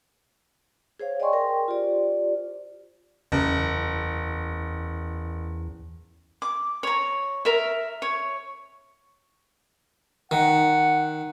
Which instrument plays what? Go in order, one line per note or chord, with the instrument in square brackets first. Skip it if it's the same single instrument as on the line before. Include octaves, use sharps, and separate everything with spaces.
[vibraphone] G#4 C5 C#5 F5
D5 D#5 G5 G#5 C6 C#6
G#4 A#4 G5 C6
F4 G4 C5 D5
[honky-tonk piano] F#1 [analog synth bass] E2
[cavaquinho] D6
C#5 A#5
A#4 E5
C#5
[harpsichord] D#3 [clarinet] F#5